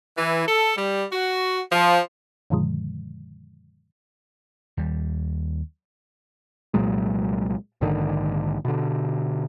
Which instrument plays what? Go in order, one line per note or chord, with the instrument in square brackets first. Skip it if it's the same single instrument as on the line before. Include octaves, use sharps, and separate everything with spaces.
[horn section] E3
A4
G3
F#4
F3
[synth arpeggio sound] F#2 A#2 D3 D#3 F3 G#3
[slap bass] D#2 G3
[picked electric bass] C2 A#2 F#3 G#3
A#1 G#2 D3 D#3
B2 D3